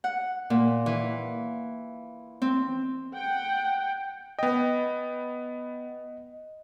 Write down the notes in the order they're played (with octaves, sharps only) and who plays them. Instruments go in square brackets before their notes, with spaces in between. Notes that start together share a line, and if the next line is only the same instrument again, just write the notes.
[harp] F#5
A#2
E3
C4
[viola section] F#5 G5
[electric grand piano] B3 G5 [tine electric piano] D#5